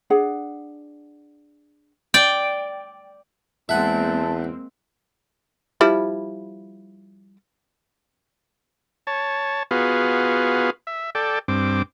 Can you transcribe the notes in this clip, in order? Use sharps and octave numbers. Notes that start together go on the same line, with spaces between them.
D4 G#4 F#5
D5 G5
E2 G#3 A#3 C4 E5 F#5 A5
F3 G3 E4
C#5 A5
B3 F4 F#4 G#4 B4 F5
E5
A4 D5 G5
G2 C4 D6